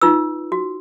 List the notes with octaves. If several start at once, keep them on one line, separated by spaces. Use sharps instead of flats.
D#4 F4 B4 E6
F#4